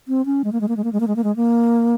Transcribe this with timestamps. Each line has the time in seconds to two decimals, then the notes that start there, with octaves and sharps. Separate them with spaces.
0.08 C4
0.26 C#4
0.44 G#3
0.52 A#3
0.61 G#3
0.68 A#3
0.77 G#3
0.84 A#3
0.93 G#3
1.00 A#3
1.08 G#3
1.16 A#3
1.24 G#3
1.36 A#3